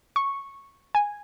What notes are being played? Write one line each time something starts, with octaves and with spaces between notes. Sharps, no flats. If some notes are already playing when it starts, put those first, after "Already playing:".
C#6
G#5